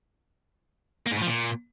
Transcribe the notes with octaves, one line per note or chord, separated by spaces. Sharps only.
A#3
G#2
A2
F3
A#2